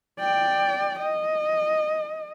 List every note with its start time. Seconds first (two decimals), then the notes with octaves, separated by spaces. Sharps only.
0.20 D5 G5
0.99 D#5